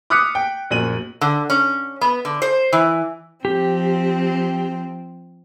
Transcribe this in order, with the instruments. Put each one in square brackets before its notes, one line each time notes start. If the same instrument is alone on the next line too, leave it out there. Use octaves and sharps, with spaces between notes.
[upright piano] D6 D#6 F6 F#6 B6 C#7
G5
A#1 F#2 D#7 F#7
[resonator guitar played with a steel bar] D3
C#4
B3
D3
C5
E3
[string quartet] F3 C4 [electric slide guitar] G4